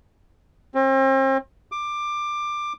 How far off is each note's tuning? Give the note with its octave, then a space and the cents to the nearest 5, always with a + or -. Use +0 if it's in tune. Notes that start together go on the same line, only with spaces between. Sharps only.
C4 +40
D6 +15